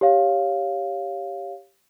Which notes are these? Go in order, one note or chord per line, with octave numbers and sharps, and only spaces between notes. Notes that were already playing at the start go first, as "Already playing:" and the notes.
G4 C#5 F5